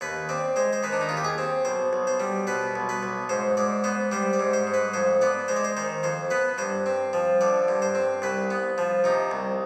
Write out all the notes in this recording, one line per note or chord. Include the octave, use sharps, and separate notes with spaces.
D#2 B4
C4 D5
G#3 C5
C5
D#3 B4
D4
D#4
D#2 F4
G4
G#4
C4
B1 C5
B1
C5
G3
B2 B4
B1
B4
B1
G#2 C5
G#2 D5
B3 C5
G3 C5
D5
G#2
C5
G#2
B4
F2 C5
B3 D5
G#3 C5
D5
C5
D#3 C5
F2 C5
B3 B4
G2 C5
C4
F3
D3 D5
G2
C5
C4
C2 B4
B3
F3
C3 D#4
C2